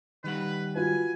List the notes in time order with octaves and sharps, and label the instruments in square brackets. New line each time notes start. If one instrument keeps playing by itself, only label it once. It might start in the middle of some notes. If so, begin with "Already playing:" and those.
[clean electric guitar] D#3 G3 F#5 [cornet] B4
[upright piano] F4 F#4 B4 [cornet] G#5